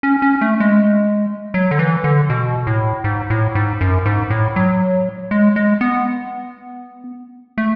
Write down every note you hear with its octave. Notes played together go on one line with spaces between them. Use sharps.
C#4
C#4
A3
G#3
F#3
D3
E3
D3
B2
A2
G#2
A2
G#2
F#2
G#2
A2
F#3
G#3
G#3
B3
A3